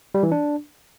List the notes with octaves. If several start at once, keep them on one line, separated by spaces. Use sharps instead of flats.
G3
E3
D4